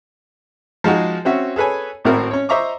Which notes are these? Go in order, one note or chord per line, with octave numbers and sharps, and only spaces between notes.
F3 G#3 D#4 F#4 G#4
C4 C#4 F#4 E5
G#4 A4 B4 C#5 G#5
G#1 A2 C4 E4 F#4 A#4
C#4 C#5
C5 D#5 E5 A#5 C#6 D6